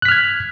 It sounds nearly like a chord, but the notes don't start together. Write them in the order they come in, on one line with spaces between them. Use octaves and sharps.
F#6 B6 F6 G#6